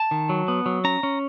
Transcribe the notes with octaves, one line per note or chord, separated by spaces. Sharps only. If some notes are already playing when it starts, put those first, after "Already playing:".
Already playing: A5
D#3
F#3
B3
F#3
C#4 A#5
C#4